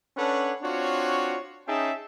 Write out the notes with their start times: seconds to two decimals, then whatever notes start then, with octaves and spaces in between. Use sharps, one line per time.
0.17 C#4 D4 A4 B4 C#5 F#5
0.62 C4 D4 F4 F#4 C#5
1.67 C#4 D#4 G#4 E5 G5 A5